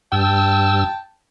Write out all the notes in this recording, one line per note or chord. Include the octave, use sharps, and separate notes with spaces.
G2 G5 A5 E6